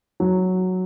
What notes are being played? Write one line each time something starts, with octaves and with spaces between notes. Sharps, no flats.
F#3